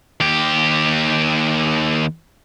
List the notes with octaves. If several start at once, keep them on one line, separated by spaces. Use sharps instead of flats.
D#2 G4